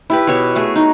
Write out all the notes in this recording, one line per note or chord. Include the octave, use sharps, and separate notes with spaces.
E4 G4 B4
B2 B3 C#5 C#6
A3 F#4 G#4
D#4